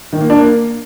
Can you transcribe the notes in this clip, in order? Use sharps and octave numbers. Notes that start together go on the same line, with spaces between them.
D#3
A#3
D4
A#3